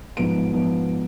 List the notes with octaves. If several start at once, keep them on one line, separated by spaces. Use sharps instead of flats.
G#2 F3 B3 D7
F3 B3